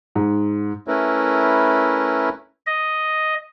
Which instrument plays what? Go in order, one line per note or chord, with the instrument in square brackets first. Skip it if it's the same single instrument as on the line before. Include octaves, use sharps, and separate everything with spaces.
[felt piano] G#2
[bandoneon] A3 C#4 E4 A#4 B4
[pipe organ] D#5